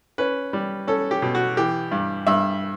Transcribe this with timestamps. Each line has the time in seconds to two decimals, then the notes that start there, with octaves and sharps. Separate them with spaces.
0.18 C#4 B4
0.53 G3
0.87 C#4 A4
1.11 G4
1.22 B2
1.35 F#4
1.57 E3 G4
1.92 G2
2.27 G2 E5